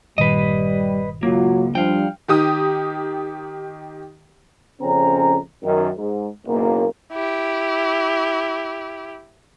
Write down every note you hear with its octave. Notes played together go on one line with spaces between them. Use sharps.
G1 A#2 D#3 G3 B4 D#5
C#2 F#3 A#3 F4 F#4
F3 G3 D4 F5 G5
D#3 G4 D#6
A#1 F2 C#3 C4 C#4 A#5
F#2 D#3
G#2
F#1 B1 A#3
E4 G4